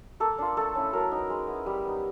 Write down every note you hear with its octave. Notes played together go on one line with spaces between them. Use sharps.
A#3 A4
D4 F4
A3 A4
C#4 E4
F#3 A#4
B3 D#4
G#3
B3 E4
G3
B3 D#4